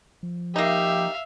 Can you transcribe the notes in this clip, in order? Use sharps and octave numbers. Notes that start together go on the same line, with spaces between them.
F3
A#3 D#4 G4 E5 F5